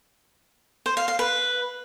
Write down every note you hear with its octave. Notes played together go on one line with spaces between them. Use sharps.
C5
F5
F5
B4